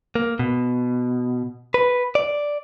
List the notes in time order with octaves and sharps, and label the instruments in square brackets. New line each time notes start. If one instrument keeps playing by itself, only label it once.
[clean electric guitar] A#3
B2
B4
D5